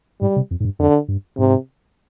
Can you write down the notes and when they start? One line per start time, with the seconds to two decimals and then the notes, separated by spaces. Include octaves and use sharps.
0.21 G#2 G3
0.36 C3
0.51 F2
0.60 G#2
0.65 G2
0.79 F2 D3
1.08 G2
1.37 G#2 C3